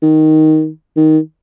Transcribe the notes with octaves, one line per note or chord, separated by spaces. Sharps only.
D#3
D#3